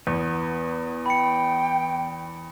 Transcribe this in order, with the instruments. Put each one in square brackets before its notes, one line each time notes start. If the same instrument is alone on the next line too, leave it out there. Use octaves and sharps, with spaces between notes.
[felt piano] E2 [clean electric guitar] B3
[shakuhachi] G5 [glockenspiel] B5 C#7